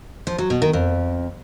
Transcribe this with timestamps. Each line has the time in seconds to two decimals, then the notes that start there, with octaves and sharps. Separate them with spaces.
0.27 F3
0.38 F#3
0.50 B2
0.62 D#3
0.73 F2